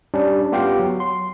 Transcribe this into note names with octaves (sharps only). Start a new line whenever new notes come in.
G3 C#4 D4
B3 F4 G4 F5 G5
F#3
C6